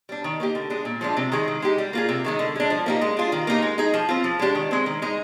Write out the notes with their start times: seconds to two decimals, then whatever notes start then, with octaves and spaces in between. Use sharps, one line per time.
0.09 G3 D4
0.24 D#3
0.40 A#3 D#4 G4
0.55 D3
0.70 G#3 D4 G#4
0.85 A#2
1.01 F3 G#3 D4
1.17 C3
1.32 D#3 G#3 D#4 G#4
1.48 D#3
1.62 G#3 D#4 G4
1.78 G3
1.93 A#3 F4 G#4
2.09 C3
2.25 D#3 G#3 D#4
2.39 D3
2.56 G#3 D4
2.70 F3
2.86 A#3 D#4 G4
3.01 G#3
3.17 D4 F4 G#4
3.32 D#3
3.47 A#3 D#4 G4
3.62 G#3
3.78 D#4 G#4
3.94 F3
4.09 C4 F4
4.24 F3
4.39 G#3 D4 G4
4.55 D#3
4.71 G#3 C4
4.86 D#3
5.02 G#3 D#4